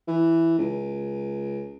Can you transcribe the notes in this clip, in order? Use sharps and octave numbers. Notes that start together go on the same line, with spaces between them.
E3
C#2